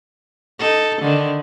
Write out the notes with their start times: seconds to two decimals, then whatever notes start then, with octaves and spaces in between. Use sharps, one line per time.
0.59 D#4 A4
1.01 D3 D#3